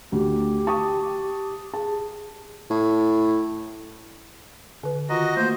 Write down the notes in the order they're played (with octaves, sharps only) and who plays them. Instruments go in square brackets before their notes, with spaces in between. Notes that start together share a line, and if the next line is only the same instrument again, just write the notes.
[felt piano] D2 [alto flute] G4
[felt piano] A5 C#6 D#6
[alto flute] G#4 [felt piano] A5
[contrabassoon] A2
[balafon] D3 B4
[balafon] D#3 F4 A#5 [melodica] F#4 D#5
[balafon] A3 A#3 F#4 [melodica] C5